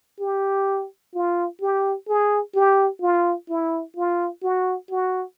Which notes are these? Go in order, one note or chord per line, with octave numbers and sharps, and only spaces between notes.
G4
F4
G4
G#4
G4
F4
E4
F4
F#4
F#4